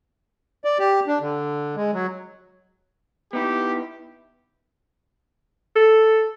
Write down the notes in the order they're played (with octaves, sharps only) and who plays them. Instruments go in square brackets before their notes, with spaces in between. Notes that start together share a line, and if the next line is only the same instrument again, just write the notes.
[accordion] D5
G4
D4
D3
G#3
F#3
[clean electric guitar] B3 D#4 E4 [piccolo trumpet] G4
[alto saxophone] A4